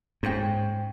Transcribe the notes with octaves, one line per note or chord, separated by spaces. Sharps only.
G#2 C#4 C5 G5